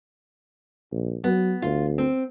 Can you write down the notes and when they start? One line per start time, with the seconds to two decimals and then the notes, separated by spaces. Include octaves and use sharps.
0.92 A#1
1.24 F#3 B3
1.62 D2 F4
1.98 C4